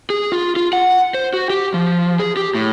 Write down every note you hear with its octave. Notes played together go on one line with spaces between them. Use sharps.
G#4
F4
F4
F#5
C5
F#4
G4
F3
G#4
G4
A2